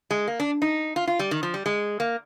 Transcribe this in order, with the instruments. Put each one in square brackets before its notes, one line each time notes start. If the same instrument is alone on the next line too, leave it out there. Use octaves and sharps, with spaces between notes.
[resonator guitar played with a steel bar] G#3
A#3
D4
D#4
F4
F4
G3
D#3
F3
G3
G#3
A#3